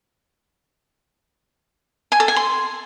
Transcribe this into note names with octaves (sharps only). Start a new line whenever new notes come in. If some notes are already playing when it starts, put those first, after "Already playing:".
G#5
A4
G#5
C6